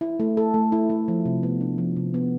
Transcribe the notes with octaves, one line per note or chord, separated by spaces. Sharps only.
E4
A3
A4
A3
E4
A3
F3
C3
B3
D4
F3
C3
B3